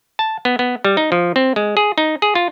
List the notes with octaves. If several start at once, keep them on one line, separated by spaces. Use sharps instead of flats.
A5
B3
B3
G3
D#4
F3
C4
G#3
G#4
D#4
G#4
F4